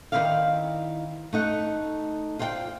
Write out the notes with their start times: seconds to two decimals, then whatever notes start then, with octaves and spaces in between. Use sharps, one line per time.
0.12 D#3 E3 C4 E4 D5 F5
1.33 A3 D#4 F#5
2.39 F4 C5 D5 F#5 G5